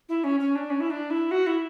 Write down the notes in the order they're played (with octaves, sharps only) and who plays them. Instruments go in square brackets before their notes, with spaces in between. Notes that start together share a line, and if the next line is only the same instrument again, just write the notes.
[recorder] E4
C#4
C#4
D4
C#4
E4
D4
E4
F#4
E4